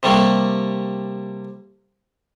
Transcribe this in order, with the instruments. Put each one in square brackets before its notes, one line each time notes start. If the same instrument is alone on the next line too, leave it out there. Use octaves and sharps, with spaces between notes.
[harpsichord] C3 G3 A3 A#3